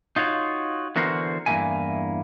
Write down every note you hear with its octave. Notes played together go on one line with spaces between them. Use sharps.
D#4 F4 F#4 C#5
D3 E3 B3 F#4 A#4 C5
E2 G2 A#2 A#3 E4 G#5